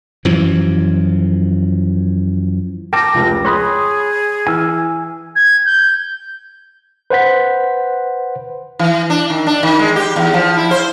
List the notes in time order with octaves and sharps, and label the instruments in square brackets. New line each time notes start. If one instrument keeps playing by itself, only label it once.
[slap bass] F#2 E3 F3
[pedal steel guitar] A#4 G5 A5 [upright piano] D6 [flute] A#6
[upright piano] F1 C#2
[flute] G#4 [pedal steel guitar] C#5 B5 D#6 [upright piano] C6 F#6
[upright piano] E3 [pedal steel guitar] G#5 E6 F6
[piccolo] G#6
G6
[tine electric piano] B4 C5 F#5 B6
[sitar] E3
D4
D#3
D4
D#3
G#3
G4
E2
F3
E4
C5